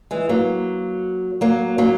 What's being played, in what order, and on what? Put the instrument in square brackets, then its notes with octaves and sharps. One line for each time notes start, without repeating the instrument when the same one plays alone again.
[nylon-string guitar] E3 G#3
F#3 A#3
F#3 A#3
F#3 A#3